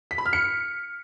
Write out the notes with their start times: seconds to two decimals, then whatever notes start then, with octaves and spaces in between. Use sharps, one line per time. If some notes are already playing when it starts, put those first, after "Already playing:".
0.11 B6
0.18 B5
0.26 F6
0.33 C#7